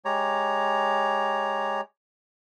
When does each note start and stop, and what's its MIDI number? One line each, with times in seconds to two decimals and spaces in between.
0.05 1.81 56
0.05 1.81 67
0.05 1.81 73
0.05 1.81 82